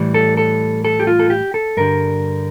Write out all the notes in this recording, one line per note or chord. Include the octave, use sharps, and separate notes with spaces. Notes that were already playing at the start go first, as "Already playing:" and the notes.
Already playing: A2 E3 G3
A4
A4
A4
G4
F4
A4
G4
A4
G2 D3 G3 A#4